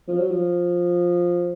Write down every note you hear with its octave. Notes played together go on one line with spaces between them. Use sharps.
F3
F#3
F3